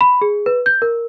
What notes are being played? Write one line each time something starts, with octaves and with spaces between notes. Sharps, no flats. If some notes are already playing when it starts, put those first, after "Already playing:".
B5
G#4
B4
G6
A#4